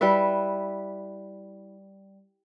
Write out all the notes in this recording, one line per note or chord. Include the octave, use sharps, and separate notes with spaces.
G3 E4 B4 E5